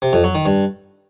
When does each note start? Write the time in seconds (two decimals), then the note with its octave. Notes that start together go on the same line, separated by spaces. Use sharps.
0.02 C3
0.13 F2
0.24 F#3
0.35 D#3
0.46 G2